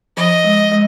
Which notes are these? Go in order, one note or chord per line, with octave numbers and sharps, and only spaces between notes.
F3 D#5
G#3
G#3